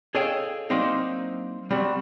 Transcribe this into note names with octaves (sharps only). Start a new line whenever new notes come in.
G#4 A4 C#5 D#5 F5 G5
F#3 A#3 C4 D4 D#4
G3 C4 F#4